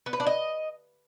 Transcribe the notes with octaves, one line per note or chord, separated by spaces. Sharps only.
B3
B4
D4
D#5